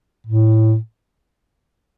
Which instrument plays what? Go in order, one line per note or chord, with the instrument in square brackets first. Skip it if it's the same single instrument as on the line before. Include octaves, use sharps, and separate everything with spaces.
[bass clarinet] A2